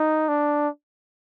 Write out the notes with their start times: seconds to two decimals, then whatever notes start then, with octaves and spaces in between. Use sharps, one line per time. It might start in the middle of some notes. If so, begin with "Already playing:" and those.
Already playing: D#4
0.28 D4